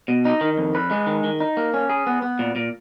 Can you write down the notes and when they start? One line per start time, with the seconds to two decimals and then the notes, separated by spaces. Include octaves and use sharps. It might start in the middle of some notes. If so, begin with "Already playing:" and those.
0.08 B2
0.25 D#4
0.41 D#3
0.58 F2
0.75 B4
0.91 G#3
1.07 D#3
1.24 D#3
1.40 D#4
1.57 A#3
1.74 C#4
1.89 G#4
2.07 B3
2.22 B3
2.39 A#2
2.56 A#2